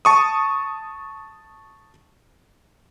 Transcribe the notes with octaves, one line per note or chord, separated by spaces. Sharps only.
A5 C#6 D#6